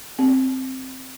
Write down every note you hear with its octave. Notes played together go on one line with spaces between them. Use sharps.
C4